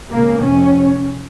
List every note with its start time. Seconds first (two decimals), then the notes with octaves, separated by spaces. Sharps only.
0.11 C#2 C#3 A#3
0.44 F1 F2 C3 C#4